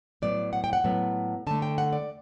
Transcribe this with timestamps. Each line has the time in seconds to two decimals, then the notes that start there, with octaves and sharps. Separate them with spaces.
0.22 A2 F#3 B3 D5
0.53 F#5
0.64 G5
0.73 F#5
0.84 A2 F#3 B3
1.47 D3 A3 A5
1.62 G5
1.78 F#5
1.93 D5